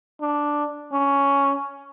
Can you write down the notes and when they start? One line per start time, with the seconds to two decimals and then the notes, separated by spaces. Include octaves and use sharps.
0.21 D4
0.92 C#4